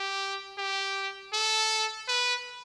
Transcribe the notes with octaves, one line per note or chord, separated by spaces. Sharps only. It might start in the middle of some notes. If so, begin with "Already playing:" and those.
Already playing: G4
G4
A4
B4